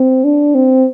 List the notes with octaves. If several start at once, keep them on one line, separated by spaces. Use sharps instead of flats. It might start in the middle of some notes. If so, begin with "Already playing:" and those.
Already playing: C4
D4
C4